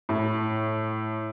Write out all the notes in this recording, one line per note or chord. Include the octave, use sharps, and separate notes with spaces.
A2